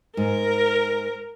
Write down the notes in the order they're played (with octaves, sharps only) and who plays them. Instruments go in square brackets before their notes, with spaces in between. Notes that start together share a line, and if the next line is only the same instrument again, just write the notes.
[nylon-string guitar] G#2 [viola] A#4